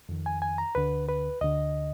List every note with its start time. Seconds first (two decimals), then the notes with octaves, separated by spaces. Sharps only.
0.09 F2 D#3
0.26 G#5
0.42 G#5
0.58 A#5
0.75 D2 D3 B4
1.08 B4
1.41 D2 D3 D#5